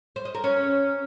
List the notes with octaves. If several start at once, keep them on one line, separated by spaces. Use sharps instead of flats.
C5
D#5
A#4
C#4